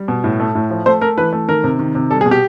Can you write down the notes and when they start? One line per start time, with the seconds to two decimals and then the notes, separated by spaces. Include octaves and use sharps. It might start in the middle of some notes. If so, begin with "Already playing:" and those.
Already playing: G3
0.08 B2
0.24 A2
0.40 A3
0.55 A2
0.70 F3
0.86 A3 C5
1.01 A3 A#4
1.18 E3 B4
1.33 A3
1.48 D#3 A#4
1.64 C3
1.79 D#3
1.95 C3
2.11 G3 A4
2.21 G#4
2.26 B2
2.31 G4